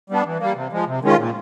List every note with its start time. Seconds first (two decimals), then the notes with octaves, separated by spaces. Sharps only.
0.10 G3 B3 D4
0.25 E3
0.40 G3 A#3
0.55 C3
0.72 F3 G#3
0.87 C3
1.02 D#3 G#3 C#4 F4
1.18 A#2